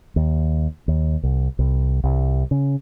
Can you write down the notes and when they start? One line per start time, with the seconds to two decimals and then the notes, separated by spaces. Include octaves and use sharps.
0.16 D#2
0.88 D#2
1.23 C2
1.59 C2
2.03 C2
2.51 C#3